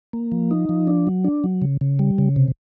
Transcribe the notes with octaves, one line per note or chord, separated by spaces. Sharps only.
A#3
F3
D#4
F3
D4
F#3
D4
F#3
C#3
C#3
G3
C#3
C3